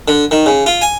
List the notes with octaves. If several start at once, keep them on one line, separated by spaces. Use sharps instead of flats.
D3
D#3
C#3
F4
G#5